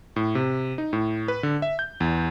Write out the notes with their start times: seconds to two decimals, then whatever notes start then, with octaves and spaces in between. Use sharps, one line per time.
0.16 A2
0.35 C3
0.78 D#4
0.93 A2
1.28 B4
1.43 D3
1.62 E5
1.79 G6
2.00 E2